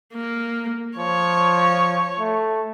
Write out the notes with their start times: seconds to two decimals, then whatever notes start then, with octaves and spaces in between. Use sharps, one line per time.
0.14 A#3
0.98 F3 C#5
2.19 A3